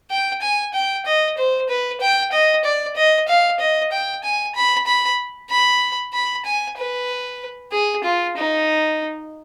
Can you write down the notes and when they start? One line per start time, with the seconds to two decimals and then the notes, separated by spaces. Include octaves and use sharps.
0.10 G5
0.42 G#5
0.74 G5
1.06 D#5
1.38 C5
1.69 B4
2.01 G5
2.32 D#5
2.64 D5
2.96 D#5
3.28 F5
3.60 D#5
3.92 G5
4.24 G#5
4.55 B5
4.86 B5
5.50 B5
6.13 B5
6.46 G#5
6.78 B4
7.72 G#4
8.04 F4
8.37 D#4